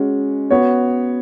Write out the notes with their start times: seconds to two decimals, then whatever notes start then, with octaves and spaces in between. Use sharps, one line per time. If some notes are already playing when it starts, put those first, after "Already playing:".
Already playing: G#3 C#4 F#4
0.50 B3 F#4 C#5